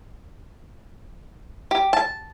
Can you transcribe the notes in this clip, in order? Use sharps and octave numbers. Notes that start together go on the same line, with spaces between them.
G4
A5